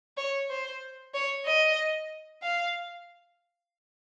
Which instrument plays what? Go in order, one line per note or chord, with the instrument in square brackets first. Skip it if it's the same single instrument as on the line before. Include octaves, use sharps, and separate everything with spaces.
[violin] C#5
C5
C#5
D#5
F5